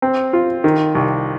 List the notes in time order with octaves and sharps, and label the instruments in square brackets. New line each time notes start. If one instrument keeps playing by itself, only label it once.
[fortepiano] C4
F4
D#3
C2